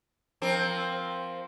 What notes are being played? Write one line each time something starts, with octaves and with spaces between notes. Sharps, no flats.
F3 C4 A#4